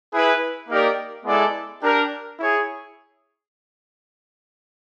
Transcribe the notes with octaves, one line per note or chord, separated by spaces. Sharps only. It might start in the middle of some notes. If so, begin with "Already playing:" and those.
E4 G#4 B4
A#3 D#4 G4 A#4 D5
G#3 B3 E4 A4 D5
D4 G4 A#4
E4 G#4 C#5